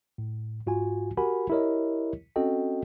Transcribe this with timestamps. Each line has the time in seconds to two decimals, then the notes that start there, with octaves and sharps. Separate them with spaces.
0.18 A2
0.67 G#2 F4 F#4 G#5
1.17 F#4 G4 A#4 F#5 G#5 B5
1.50 E4 G4 A#4 C#5 D#5
2.36 C4 C#4 F#4 A4 D#5 G5